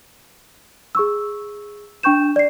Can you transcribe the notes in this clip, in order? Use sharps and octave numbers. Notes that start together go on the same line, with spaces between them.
G#4 C#6 E6
D4 G5 C#6 G6 E7
D5 C7